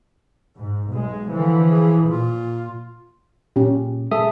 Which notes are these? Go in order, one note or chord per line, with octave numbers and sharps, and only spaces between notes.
G#2
B1 G#3
D3 E3 F3
G#4
A#2 F4
A#2 C#4 G4
G#3 G#4 A4 E5 D#6